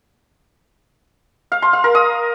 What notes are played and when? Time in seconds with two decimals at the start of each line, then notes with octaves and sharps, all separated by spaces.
1.52 F5
1.62 C6
1.73 F5
1.84 A#4
1.95 D#6